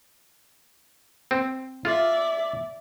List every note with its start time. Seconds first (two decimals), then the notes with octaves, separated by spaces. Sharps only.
1.31 C4
1.85 F4 D5 E5